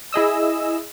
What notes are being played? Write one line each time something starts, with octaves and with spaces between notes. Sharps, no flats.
E4 G#4 D#5 E6